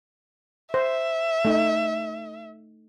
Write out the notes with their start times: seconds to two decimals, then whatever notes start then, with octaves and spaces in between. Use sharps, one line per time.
0.74 C5 E5
1.45 A3 D#4